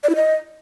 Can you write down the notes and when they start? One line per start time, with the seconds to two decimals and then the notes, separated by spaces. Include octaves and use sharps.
0.03 D5
0.10 E4
0.16 D#5